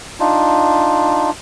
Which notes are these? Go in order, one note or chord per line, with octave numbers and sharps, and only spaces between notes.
D4 D#4 F4